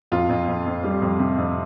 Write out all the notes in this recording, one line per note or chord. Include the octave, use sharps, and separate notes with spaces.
F2 F4
F2
F2
F2
G3
F2
C3
F2